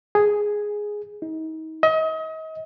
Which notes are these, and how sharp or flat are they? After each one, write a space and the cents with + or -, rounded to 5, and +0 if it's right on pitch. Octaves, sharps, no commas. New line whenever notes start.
G#4 +0
D#4 +35
D#5 +35